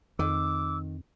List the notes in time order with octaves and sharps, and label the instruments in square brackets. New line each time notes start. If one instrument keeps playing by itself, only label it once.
[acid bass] F2 [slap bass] D#3 [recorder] D6 [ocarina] E6